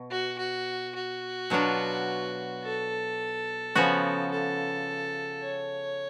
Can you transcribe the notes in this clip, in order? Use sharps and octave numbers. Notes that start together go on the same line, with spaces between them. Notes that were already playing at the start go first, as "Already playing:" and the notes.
Already playing: B2
F#4
F#4
F#4
B2 F#3 B3 D4 F4
A4
C#3 F3 B3 F#4
A4
C#5